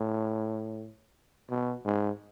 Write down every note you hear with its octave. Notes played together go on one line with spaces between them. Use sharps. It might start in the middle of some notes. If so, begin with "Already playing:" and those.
Already playing: A2
B2
G#2